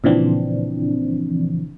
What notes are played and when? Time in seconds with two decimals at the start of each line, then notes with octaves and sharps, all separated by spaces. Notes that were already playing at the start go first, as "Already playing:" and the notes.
0.04 A#2 C#3 E3 F3 C4 D4